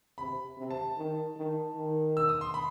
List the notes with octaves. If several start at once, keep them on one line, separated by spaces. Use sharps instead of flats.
C3 B5
C3
A5
D#3
D#3
D#3
E6
D#6
C6
B5